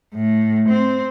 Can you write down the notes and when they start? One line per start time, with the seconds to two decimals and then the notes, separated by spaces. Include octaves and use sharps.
0.14 A2
0.69 C4